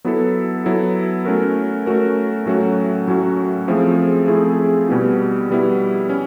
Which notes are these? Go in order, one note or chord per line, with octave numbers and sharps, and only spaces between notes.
F#3 B3 E4 A4
F#3 B3 E4 A4
A3 C#4 F#4 A#4
A3 C#4 F#4 A#4
A2 F#3 A3 C#4 F#4
A2 F#3 A3 C#4 F#4
F3 A3 C4 E4 G#4
F3 A3 C4 E4 G#4
B2 G3 B3 E4
B2 G3 B3 E4
C#4